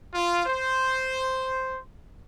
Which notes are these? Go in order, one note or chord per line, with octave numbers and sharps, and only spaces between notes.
F4
C5